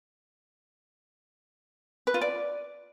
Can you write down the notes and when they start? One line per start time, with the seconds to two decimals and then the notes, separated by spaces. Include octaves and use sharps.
2.07 B4
2.14 F4
2.21 D5